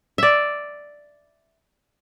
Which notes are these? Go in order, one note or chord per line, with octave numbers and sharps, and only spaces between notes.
D5 E5